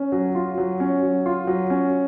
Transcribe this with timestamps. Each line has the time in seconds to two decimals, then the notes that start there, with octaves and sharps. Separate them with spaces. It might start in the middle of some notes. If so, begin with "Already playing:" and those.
Already playing: C#4
0.12 F#3
0.35 F4
0.58 F#3
0.80 C#4
1.03 F#3
1.26 F4
1.47 F#3
1.70 C#4